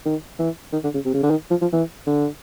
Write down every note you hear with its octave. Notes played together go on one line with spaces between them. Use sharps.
D#3
E3
D#3
D3
C#3
C3
C#3
D3
D#3
F3
F3
E3
D3